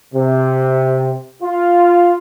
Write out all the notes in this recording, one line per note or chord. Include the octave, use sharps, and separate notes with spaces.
C3
F4